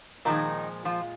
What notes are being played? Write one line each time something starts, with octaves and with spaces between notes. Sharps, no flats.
A#2 D#3 F3 G#3 D#4
F3 F4